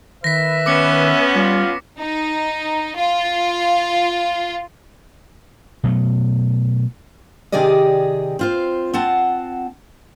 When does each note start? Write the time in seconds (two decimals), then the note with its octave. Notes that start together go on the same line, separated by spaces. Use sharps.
0.24 D#3 B4 E5 A#6 B6
0.66 B3 C#4 D6 C#7
1.35 G3 F4
1.98 D#4
2.96 F4
5.84 B2 F#3 A3
7.52 C3 D#3 G4 G#4 D5 D#5
8.39 C4 F4 C5
8.94 C4 F4 F#5 A5